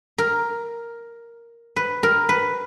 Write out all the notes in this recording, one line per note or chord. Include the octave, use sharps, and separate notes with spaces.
A#4
B4
A#4
B4